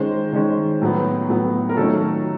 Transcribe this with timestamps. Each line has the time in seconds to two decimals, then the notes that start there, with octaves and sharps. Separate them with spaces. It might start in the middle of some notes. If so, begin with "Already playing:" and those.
Already playing: D#3 G#3 C#4 C5
0.33 D#3 G#3 C#4
0.81 A2 F#3 B3
1.29 A2 F#3 B3
1.69 A#4
1.77 D#3 F#3 A3 C#4 A4